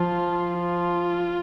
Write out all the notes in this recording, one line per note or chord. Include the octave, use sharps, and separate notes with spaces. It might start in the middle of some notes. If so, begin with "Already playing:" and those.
Already playing: F3 F4
F4